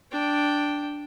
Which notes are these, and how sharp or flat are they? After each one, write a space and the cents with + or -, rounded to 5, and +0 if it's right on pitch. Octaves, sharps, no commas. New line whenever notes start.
D4 +0 G5 +0